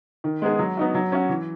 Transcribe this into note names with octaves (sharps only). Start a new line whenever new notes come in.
D#3
G#3 B3 D#4 G#4
F#3
B3 D#4 F#4
F#3
C#4 F#4
E3